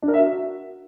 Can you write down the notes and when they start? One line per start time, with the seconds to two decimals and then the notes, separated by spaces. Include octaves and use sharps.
0.02 D4
0.08 A#4
0.14 E5
0.19 F#4